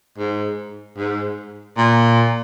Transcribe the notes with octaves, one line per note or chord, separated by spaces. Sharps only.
G#2
G#2
A#2